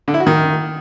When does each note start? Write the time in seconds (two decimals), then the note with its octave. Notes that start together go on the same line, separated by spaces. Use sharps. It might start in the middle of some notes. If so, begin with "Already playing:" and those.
0.08 D3
0.14 E4
0.20 F#4
0.27 D#3